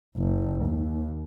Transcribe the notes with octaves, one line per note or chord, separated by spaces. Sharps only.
F#1
D#2